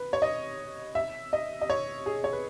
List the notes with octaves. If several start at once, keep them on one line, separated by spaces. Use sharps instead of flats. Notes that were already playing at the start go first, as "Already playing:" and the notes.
Already playing: B4
C#5
D#5
E5
D#5
D#5
C#5
G#4
C#5
B4